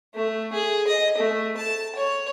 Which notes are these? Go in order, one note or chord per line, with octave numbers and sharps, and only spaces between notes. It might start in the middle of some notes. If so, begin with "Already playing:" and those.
A3
G#4
D#5
A3
A5
C#5